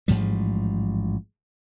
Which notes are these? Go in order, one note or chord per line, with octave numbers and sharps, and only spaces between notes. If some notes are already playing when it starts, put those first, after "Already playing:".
A1 G#2 F3 G3